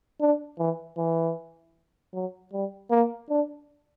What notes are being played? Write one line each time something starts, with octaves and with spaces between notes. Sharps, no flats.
D4
E3
E3
F#3
G3
A#3
D4